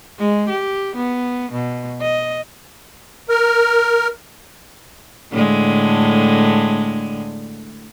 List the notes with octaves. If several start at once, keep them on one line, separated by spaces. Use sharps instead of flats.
G#3
G4
B3
B2
D#5
A#4
A2 D3 G#3